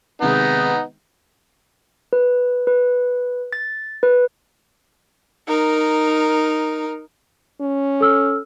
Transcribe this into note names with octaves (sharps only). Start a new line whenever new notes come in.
C3 D#3 G#3 B3 D#4
B4
B4
A6
B4
D#4 A#4
C#4
A4 E6 F6